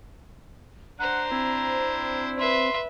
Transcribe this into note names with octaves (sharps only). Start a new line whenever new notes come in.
D4 C5 F#5 A#5
C4 E4
B4 E5 C6